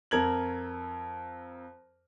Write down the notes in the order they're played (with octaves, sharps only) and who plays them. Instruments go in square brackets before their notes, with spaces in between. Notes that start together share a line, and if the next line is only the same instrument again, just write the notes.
[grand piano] F2 A#4 G#6 F#7